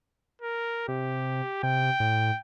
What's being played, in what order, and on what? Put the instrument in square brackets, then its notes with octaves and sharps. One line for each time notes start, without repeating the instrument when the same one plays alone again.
[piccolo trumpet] A#4
[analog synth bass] C3 [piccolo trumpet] G4
[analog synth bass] C3 [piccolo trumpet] G5
[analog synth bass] A2